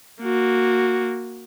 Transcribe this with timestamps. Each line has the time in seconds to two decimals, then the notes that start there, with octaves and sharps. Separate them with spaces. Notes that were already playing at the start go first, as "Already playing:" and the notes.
0.22 A#3 F#4